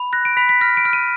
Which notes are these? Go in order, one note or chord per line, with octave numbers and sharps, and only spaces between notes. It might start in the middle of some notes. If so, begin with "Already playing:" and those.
Already playing: B5
F#6 A#6
D7
B5 B6
B6
F6 A#6
D7
F6
D#7